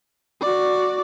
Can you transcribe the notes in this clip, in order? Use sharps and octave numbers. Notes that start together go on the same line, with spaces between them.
F#4 D5